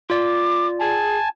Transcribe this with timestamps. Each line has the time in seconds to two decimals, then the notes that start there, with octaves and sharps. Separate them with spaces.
0.10 F4 D5 D6
0.81 G#4 G#5 A5